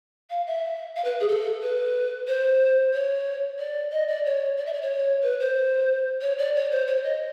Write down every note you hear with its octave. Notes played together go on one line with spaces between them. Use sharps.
F5
E5
F5
B4
G#4
A4
B4
C5
C#5
D5
D#5
D5
C#5
D5
E5
D5
C#5
B4
C5
C#5
D5
C#5
C5
C#5
D#5